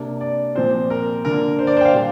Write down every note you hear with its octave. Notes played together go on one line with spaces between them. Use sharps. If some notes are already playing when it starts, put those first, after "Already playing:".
Already playing: C3 A#3 D4
D5
A#2 F3 C4 C5
A#4
D3 A#3 D4 A#4
C5
D5
C5
G5
F5
A#2 G3 D4